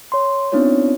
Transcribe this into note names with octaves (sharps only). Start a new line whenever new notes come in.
C#5 C6
B3 C4 D4 D#4 F4 C#5